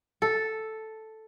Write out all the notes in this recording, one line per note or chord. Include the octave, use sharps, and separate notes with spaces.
A4